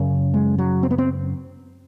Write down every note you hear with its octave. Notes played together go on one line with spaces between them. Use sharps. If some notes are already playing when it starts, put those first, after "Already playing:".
Already playing: F#2 C#3
G#3
F#3
C4
B3
C4